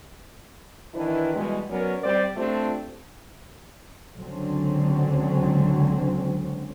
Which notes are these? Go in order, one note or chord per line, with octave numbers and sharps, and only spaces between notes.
D#3 E3 D4 E4 B4
B2 E3 G3 G#3
F#3 B3 C#4 A#4 D5
G3 C4 C5 D5
A3 C4 D4 F4 G4
C#2 D3 F#3 C4 C#4